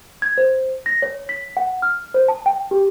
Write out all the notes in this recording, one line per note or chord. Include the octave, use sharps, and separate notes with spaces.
G#6
C5
A#6
C#5
B6
F#5
F6
C5
A5
G5
G4